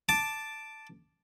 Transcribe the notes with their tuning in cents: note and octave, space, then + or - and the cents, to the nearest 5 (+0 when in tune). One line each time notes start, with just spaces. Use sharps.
A5 +0 D6 +0